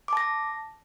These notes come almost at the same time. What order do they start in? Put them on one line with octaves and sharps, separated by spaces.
D6 A5 A#6